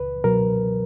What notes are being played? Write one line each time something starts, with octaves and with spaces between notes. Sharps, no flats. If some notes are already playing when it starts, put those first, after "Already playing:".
Already playing: C#2 B4
B2 F#3 A#4